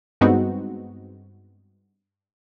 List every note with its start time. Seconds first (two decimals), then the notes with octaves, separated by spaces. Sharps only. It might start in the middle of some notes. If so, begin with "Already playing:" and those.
0.21 G2 G#3 B3 C4 D#4 F#4